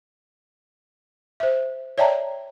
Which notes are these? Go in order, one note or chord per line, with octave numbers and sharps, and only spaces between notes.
C5 E5
C#5 D5 E5 G5 A5 A#5